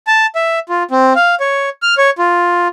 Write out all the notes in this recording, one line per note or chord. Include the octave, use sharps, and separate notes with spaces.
A5
E5
F4
C4
F5
C#5
F6
C#5
F4